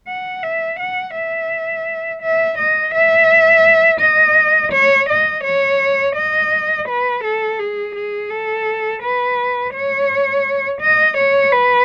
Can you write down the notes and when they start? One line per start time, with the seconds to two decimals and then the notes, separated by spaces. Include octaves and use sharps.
0.08 F#5
0.43 E5
0.79 F#5
1.15 E5
2.22 E5
2.58 D#5
2.94 E5
4.01 D#5
4.72 C#5
5.09 D#5
5.44 C#5
6.15 D#5
6.88 B4
7.24 A4
7.59 G#4
7.95 G#4
8.30 A4
9.02 B4
9.73 C#5
10.81 D#5
11.17 C#5
11.52 B4